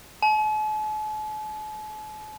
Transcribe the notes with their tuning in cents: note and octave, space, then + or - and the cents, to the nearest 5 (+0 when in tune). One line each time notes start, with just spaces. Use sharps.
A5 -45